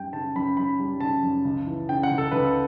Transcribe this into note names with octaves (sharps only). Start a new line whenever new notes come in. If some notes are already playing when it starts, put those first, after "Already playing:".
Already playing: F#2 G3 G5
C#3 A5
F#2 B5
F#2 B5
G3
C#3 A5
F#2
C#2
E3
C#3 G5
F#5
C#2
A4
C#2 B4
A4